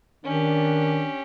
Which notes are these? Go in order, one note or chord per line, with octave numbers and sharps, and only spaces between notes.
D#3 C#4 D4 G4